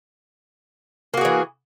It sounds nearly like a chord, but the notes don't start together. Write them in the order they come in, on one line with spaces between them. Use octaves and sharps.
A#3 F#4 G#4 E3